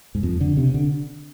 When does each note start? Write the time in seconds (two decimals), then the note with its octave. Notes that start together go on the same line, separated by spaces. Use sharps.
0.15 G#2
0.23 F2
0.41 D3
0.57 C3
0.74 D3